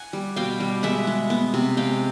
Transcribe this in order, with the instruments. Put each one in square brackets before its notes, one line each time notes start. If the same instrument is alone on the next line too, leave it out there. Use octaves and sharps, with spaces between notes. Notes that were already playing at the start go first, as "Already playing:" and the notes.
Already playing: [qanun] F#5 G#5
G3
B2 F5 G5
G3
G#3 E5 F#5
G#3
B3
C3
G#3 F5 G5